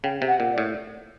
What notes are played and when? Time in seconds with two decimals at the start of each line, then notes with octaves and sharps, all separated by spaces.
0.04 C#3 G5
0.22 C3
0.28 F#5
0.40 A#2
0.52 D5
0.58 A2